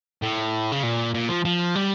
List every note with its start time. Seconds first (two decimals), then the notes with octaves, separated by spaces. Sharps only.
0.22 A2
0.72 C#3
0.83 A#2
1.14 A#2
1.29 F3
1.45 F3
1.75 G3